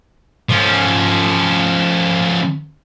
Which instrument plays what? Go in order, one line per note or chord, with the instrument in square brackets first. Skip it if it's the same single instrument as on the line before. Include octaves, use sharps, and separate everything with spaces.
[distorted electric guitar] F3 C#4